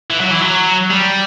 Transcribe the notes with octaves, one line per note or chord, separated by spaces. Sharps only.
E3
F#3
E3
F#3
G3